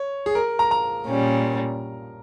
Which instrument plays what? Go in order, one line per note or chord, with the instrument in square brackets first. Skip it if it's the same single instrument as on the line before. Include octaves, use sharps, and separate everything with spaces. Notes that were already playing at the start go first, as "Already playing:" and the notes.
Already playing: [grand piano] C#5
G#4
A#4
A#5
A#5
[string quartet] A#2 G3 C#4